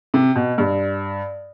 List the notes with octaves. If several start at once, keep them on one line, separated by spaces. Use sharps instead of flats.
C3
B2
G2